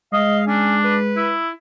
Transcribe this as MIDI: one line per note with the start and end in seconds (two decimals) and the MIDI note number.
0.13 1.41 56
0.13 0.39 75
0.13 0.45 77
0.47 0.76 61
0.47 0.96 62
0.84 1.31 71
1.17 1.50 64